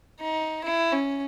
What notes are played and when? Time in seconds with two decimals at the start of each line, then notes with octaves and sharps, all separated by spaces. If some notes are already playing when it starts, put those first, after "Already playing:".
0.21 D#4
0.64 E4
0.92 C#4